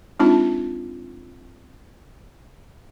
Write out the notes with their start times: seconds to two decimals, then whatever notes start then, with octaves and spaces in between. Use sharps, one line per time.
0.20 G#3 C4 D4 D#4 F4 A5